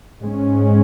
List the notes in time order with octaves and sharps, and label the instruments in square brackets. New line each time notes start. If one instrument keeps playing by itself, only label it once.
[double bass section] G#2 G#3 C#4